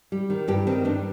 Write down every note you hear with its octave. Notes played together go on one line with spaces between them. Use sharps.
G3
D#3
G2 G4
D#3 C4
G2 D4